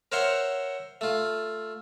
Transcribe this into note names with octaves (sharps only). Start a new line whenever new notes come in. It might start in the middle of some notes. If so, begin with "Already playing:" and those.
A#4 C5 C#5 E5 F#5 C6
A3 F4